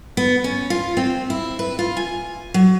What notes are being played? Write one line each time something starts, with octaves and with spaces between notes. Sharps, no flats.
B3
C#4
F4
C4
E4
B4
F4
G#5
F#3